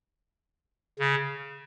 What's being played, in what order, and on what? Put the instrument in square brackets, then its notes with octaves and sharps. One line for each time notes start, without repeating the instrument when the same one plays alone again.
[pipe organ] C#3